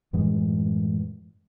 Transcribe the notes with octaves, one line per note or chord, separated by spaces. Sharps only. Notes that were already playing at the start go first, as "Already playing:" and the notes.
F#2 A2 E3 G#3